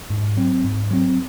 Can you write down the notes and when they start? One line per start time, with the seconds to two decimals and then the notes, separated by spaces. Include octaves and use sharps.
0.10 G#2
0.37 F#3 C4
0.64 G#2
0.91 F#3 C4